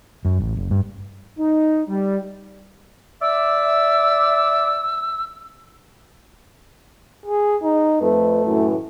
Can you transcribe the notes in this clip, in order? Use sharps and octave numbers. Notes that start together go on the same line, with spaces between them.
F#2
A1
F#1
G2
D#4
G3
D5 E5 E6
G#4
D#4
F2 A3 B4
F#2 A2 E3